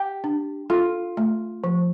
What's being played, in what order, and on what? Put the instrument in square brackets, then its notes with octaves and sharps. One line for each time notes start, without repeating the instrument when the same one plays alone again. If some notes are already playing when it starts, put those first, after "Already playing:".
Already playing: [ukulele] G4
[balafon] D4
[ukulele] F4 [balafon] A4
[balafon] A3
F3